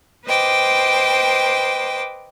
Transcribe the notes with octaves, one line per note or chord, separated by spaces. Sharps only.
B4 C5 D#5 G5 D6